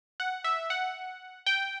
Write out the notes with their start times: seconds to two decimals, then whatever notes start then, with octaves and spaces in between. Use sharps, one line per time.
0.20 F#5
0.44 E5
0.70 F#5
1.46 G5